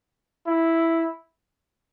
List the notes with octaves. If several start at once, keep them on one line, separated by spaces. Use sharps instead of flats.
E4